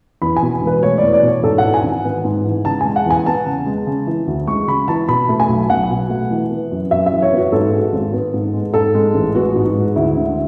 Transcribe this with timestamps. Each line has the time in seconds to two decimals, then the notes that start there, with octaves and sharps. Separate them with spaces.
0.22 E2 B5
0.37 G#5
0.42 B2
0.62 E1
0.67 B4
0.83 A3 C#5
0.98 E2 D5
1.13 D5
1.23 B2 C#5
1.43 G#2 A4
1.58 F#5
1.64 E3
1.74 G#5
1.84 G#1
2.04 B3
2.25 G#2
2.45 E3
2.65 C#3 A5
2.81 G#3 G#5
2.96 F#5
3.06 E2 G#5
3.26 B3 A5
3.46 C#3
3.66 G#3
3.87 C#3
4.07 E3
4.27 D2
4.48 G#3 C#6
4.68 C#3 B5
4.88 E3 A5
5.08 B2 B5
5.29 A3
5.40 G#5
5.49 B1
5.70 B1 F#5
5.89 B2
6.10 A3
6.31 E3
6.51 B3
6.72 F#2
6.91 F#2 E5
7.06 E5
7.12 E3
7.22 C#5
7.32 B3 F#4
7.52 G#2 A4
7.72 G#3
7.93 G#1
8.13 B3
8.34 G#2
8.54 G#3
8.74 G#2 A4
8.95 G#3
9.14 A1
9.35 B3 F#4
9.56 G#2
9.65 F#4
9.75 G#3
9.96 D2 E4
10.17 D3